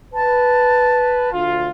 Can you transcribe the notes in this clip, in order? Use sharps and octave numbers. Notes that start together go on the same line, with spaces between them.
B4 A5
D2 F4